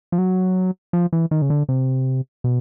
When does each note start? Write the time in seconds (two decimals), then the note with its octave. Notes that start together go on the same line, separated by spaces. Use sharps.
0.12 F3
0.18 F#3
0.93 F3
1.13 E3
1.31 D#3
1.42 C#3
1.50 D3
1.69 C3
2.44 B2